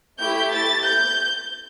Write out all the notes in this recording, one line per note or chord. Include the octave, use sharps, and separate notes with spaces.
A3 E4 G4 G6
A6
G6